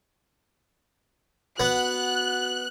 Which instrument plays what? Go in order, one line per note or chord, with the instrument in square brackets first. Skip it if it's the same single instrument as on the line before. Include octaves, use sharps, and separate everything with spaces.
[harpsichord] B3 [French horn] F#4 [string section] F#6